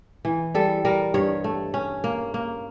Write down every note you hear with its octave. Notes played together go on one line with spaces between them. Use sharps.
E3
G3 A4
G3 A#4
G2 C#5
A3
C#4
A#3
A#3